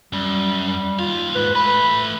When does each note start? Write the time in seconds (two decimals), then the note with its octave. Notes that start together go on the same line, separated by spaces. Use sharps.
0.13 F#2 G3
0.67 G3
0.99 D#2 F4 F5
1.35 G#2 B4
1.55 A3 B4 B5